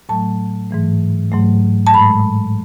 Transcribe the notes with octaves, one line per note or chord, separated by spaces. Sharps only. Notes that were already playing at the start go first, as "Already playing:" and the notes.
A2 F#3 A3 A5
G#2 E3 A3
G#2 F#3 A3
A5
A2 G#3 B5